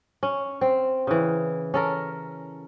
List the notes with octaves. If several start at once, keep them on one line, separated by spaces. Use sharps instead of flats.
C#4
C4
C#3 E3
C#4 A4 A#4